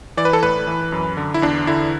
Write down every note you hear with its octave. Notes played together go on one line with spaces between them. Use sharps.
E3 D5
B4
A4
A2 B4
E3
F#2
D3
E4
E2 D4
D3 E4